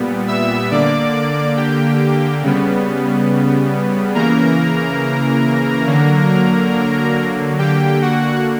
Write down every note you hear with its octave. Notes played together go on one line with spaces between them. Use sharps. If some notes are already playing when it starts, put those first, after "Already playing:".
Already playing: A#2 G3 B3
E5 E6
D3 A#3 D5 D6
G4 G5
C#3 G3 B3
C#3 E3 A#3 A#4 A#5
D3 F#3 A#3
D3 A#3 G4 G5
F#4 F#5